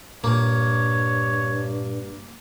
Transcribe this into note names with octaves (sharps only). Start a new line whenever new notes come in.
G2 A#2 A#3 C#5